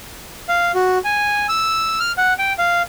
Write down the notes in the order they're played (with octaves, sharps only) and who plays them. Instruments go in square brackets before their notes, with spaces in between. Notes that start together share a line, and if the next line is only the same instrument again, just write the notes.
[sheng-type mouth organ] F5
F#4
G#5
E6
F6
F#5
G5
F5